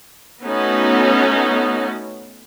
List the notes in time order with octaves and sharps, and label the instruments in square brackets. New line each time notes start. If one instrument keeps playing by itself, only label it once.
[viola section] A3 B3 C#4 D#4 F#4